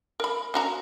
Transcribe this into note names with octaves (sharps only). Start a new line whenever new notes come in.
A#4 B5
C#4 F#4 A#5